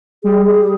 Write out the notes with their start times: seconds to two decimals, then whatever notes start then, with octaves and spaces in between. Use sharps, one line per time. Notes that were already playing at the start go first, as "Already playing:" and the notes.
0.24 G3 G#4
0.46 G#4